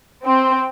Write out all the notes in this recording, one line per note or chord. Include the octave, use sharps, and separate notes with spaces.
C4